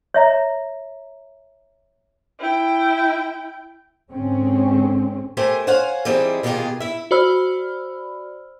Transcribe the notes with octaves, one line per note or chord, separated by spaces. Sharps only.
C#5 E5 A#5
E4 G5
G#2 D3 G#3 C4 C#4
A3 G4 A#4 C5 G#5
C5 C#5 F5 F#5 G#5
E3 G3 C4 D#4 E4 G#4
B2 D#3 A#3 F4 G4 G#4
E4 E5
F#4 C5 D5 B5 E6 F6